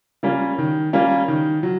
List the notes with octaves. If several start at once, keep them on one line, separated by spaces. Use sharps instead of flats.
G3 A#3 C#4 F4
D#3
G3 A#3 C#4 F4
D#3
F#3